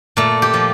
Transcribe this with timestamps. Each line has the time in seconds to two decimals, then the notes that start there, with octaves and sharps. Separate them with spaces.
0.17 A#2 A3
0.42 G4
0.54 F3